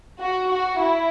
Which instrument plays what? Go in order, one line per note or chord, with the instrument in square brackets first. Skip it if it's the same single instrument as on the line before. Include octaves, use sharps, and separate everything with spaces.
[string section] F#4
F#4
E4